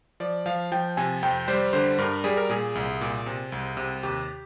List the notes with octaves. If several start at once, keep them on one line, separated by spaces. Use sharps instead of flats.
F3 D5
F3 F5
F3 G5
C3 G#5
F2 G5
G3 C5
D3 C5
G2 A#4
G3 G#4
A#4
A#2 G#4
C2
A#2
C3
C2
C3
D#2 G4